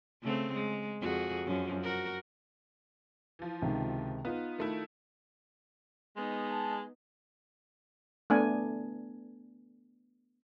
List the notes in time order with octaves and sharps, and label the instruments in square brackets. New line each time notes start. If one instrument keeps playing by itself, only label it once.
[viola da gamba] C#3 A3 C4
G#3
F2 F#4 G#4
F#2 F3 C#4
F#4 A#4
[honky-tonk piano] E3 F3
[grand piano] C#2 C3 D#3
[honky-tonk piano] B3 [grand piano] D#4 F4
[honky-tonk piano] D#3 A3 E4
[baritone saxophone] G#3 [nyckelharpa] B3 D#4
[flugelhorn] A5
[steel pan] A3 B3 D4 G#5